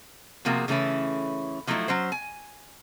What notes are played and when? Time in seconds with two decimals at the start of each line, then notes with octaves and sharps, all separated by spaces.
0.45 C3 F3 A#3 F#4 G#4
0.68 C#3 E3 A3 C#4 E4
1.67 F3 F#3 A3 D#4 E4
1.88 F#3 C#4 C5
2.12 G#5